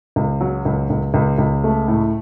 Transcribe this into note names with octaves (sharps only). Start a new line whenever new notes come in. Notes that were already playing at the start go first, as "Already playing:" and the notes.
C#2
F#3
C#2
C#2
C#2
C#2
A3
A2